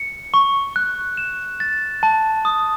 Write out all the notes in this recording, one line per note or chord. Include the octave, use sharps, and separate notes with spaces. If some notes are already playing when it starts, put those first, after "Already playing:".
Already playing: C#7
C#6
F#6
E7
A6
A5
D#6